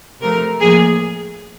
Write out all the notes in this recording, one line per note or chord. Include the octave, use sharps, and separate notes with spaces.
C3 F3 A3 A#4
A2 F3 A#3 G#4